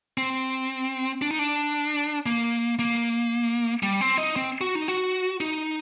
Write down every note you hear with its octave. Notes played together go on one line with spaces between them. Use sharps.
C4
D4
D#4
D4
A#3
A#3
G3
C4
D#4
C4
F#4
D#4
F#4
D#4